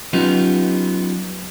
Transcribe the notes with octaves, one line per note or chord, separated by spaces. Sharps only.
F#3 B3 C#4 D#4 F4 G4